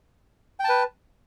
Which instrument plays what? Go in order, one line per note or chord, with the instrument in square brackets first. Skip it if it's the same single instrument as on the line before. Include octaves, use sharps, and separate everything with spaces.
[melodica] G5
A5
B4